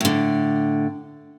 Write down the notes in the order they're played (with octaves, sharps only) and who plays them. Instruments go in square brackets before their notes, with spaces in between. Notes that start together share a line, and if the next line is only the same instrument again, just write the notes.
[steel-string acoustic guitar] A2 D3